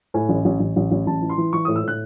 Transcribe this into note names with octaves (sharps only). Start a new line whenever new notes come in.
A2 G#5
A1
A1
A1
A1
A1
A1 A5
E3
C6
E3
E3 C#6
A2 D#6
E6
A2 F#6